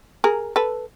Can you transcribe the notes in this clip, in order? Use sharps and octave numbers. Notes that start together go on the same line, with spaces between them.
G#4 A#4
A4 B4